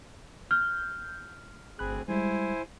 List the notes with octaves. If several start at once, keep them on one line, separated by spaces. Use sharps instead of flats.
F6 G6
G1 D2 C4 G#4 B5 F#6
G3 G#3 E4 C5 G#5